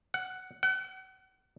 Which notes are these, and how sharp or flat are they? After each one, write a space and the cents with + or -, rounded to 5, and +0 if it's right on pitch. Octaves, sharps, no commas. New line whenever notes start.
F#5 +10
F#5 +40